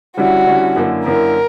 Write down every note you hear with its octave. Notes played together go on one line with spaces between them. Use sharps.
D3 G3 C#4 E4 F#4
D3 G3 C#4 E4
F#2 D3 A#3 E4
F#2 D3 A#3 E4 A#4